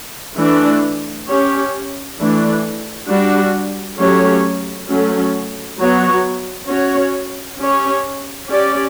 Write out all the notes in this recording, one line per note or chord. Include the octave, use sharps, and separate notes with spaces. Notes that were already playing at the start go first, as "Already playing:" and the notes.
E3 A3 D4
C#4 G4 C#5
E3 A3 D4
G3 D4 F#4
F#3 A3 C#4 G4 C#5
F#3 A3 C#4
F#3 B3 F#4 C#5
C#4 F#4 C#5
C#4 G4 C#5
C#4 G4 D5